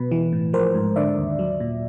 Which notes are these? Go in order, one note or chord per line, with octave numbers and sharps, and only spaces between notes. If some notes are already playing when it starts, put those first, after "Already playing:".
Already playing: B2 B4
E3
A2
F3 A#4 C5
G#2
D3 D5 E5
D#2
F#3
A#2